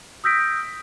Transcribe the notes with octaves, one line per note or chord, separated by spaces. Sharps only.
D#6 E6 G6 A#6 B6 D7